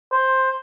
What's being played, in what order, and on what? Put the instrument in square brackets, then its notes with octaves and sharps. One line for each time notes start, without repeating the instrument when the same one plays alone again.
[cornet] C5